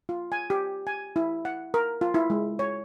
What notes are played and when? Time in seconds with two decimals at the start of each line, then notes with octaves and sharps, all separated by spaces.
0.09 F4
0.32 G#5
0.50 G4
0.87 G#5
1.16 E4
1.45 F#5
1.74 A#4
2.01 F4
2.14 E4
2.30 G#3
2.59 C#5